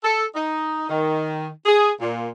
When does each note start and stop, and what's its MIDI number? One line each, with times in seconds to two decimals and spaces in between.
0.04 0.24 69
0.35 0.86 63
0.89 1.47 51
1.66 1.89 68
2.01 2.28 46